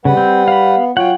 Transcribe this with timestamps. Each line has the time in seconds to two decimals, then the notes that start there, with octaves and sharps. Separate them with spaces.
0.05 C#3 G3 B4 F#5
0.17 C4
0.48 F5 B5
0.77 B3
0.97 F#3 F4 C#5 F#5 G5